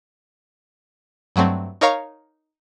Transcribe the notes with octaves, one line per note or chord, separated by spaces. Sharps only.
G2 F#3 A3 C4
D#4 A#4 C#5 F5 A#5 C#6